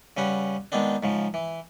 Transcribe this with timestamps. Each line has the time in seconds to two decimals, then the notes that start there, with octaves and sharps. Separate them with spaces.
0.17 C#3 G3 C#4 B4 F#5
0.72 D#3 G#3 B3 C4 D4
1.03 G#2 C#3 F3
1.34 E3